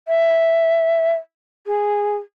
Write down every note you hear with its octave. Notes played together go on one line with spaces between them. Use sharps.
E5
G#4